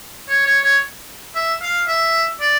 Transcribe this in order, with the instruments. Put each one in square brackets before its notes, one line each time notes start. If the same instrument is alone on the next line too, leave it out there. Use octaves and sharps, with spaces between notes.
[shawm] C#5
C#5
C#5
E5
F5
E5
D5